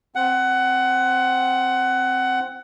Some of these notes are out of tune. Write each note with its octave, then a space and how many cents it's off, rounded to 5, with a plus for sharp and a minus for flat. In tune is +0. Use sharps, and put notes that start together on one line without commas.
C4 +0 F#5 +15